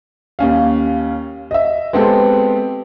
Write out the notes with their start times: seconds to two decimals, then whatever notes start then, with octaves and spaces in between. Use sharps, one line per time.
0.39 D#2 C#4 F5
1.51 D#5 E5
1.93 G#3 B3 C4 G4 A4